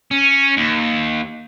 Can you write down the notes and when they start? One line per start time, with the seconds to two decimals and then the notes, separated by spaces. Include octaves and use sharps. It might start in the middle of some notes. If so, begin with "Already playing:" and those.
0.11 C#4
0.57 D#2